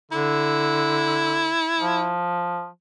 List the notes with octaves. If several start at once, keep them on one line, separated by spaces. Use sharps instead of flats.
D3 E4
F3